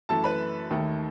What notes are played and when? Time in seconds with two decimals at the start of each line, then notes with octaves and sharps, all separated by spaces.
0.09 F#2 E3 A3 A4 A5
0.24 B4 B5
0.70 D#2 D#3 A3